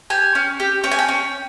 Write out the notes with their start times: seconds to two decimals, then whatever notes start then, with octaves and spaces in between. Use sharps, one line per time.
0.10 G4 G#5
0.35 C#4
0.60 G4
0.84 C#4 G5
0.91 G#5
0.99 G5
1.08 C#4